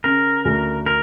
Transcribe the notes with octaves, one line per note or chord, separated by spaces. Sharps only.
C#3 A#4
D2
A#4